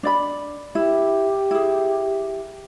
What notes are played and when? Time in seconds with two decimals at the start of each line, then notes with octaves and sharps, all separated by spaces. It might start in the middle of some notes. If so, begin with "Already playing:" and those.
0.03 D4 D5 B5
0.75 E4 G4
1.51 E4 G#4